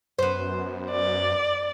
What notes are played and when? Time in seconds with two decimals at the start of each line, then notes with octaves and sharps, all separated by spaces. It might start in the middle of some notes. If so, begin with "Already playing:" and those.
0.19 F#2 B3 C5
0.91 D5